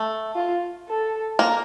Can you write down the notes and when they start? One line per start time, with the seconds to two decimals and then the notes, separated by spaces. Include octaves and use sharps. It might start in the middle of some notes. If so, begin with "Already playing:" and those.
Already playing: A3
0.35 F4
0.88 A4
1.39 A#3